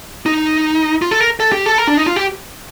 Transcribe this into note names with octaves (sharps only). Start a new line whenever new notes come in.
D#4
F4
A4
A#4
A4
G4
A4
A#4
D4
D#4
F4
G4